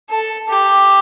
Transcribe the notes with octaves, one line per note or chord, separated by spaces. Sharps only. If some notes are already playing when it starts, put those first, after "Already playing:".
A4
G4